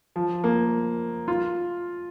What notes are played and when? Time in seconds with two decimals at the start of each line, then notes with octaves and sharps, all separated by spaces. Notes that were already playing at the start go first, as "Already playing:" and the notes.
0.16 F3
0.44 A#3
1.28 F4